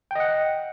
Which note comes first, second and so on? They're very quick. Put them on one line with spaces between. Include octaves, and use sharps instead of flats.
G5 D#5 F#5